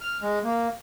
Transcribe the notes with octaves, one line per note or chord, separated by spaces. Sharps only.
F6
G#3
A#3